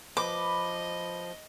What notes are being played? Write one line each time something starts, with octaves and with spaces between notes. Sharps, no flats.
F3 B4 D#5 D6